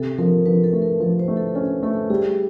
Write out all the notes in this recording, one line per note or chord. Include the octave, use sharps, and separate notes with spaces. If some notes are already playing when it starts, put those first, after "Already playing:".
Already playing: C3 A4
F3 A#4
F3 B4
A4
A3
A#4
F3 B4
C5
A3
A4
C#4 A4
A3 A4
G3 G#4